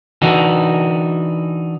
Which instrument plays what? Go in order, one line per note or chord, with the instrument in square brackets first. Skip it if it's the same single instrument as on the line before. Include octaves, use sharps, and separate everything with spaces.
[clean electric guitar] E3 D4 D#4 F#4 A4